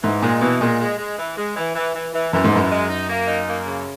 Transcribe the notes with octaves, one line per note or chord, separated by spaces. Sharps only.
G#2 E3
A#2 G#3
B2 E3
A#2 G#3
G#3
G#3
E3
G#3
E3
E3
E3
E3
F#2 E3
G#2
F#2 E3
G#3
D#4
A#3
D#4
A#3
C#3